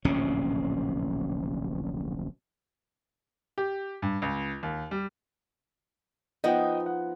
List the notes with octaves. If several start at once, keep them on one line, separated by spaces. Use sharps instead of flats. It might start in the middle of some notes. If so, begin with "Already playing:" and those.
D1 A#1 C3 C#4
G4
G2
C#2
D#2
G3
F3 B3 D#4 D#5 F#5 G5
F#5